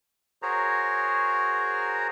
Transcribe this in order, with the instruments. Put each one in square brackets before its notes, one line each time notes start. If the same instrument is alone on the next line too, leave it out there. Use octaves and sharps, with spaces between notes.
[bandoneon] F#4 G#4 A#4 C5 C#5 A#5